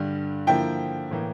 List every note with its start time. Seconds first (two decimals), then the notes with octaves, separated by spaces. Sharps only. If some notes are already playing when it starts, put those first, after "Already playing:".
Already playing: G2 D3 G3
0.47 D3 F3 A#3 E4 G5
1.11 A2 E3 A#3